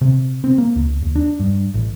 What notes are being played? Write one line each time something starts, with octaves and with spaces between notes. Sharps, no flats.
C3
C4
A#3
C#2
D#2
D4
G2
A1